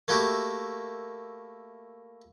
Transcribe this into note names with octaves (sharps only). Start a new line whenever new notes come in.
A3 A#3 E4 F#4 G4